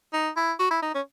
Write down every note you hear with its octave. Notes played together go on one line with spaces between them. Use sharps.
D#4
E4
F#4
E4
D#4
C#4